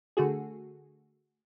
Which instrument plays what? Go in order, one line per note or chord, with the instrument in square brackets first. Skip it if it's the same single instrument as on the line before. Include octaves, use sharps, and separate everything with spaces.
[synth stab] D3 A3 F#4 G#4